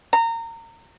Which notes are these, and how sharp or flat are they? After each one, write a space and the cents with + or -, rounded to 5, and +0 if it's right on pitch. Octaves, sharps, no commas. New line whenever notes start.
A#5 -25